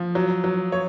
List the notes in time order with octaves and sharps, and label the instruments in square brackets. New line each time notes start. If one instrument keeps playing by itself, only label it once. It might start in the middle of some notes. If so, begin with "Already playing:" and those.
Already playing: [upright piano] F3
F#3
F#3
C#5